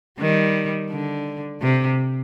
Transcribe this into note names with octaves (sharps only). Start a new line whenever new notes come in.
D#3 G3
D3
C3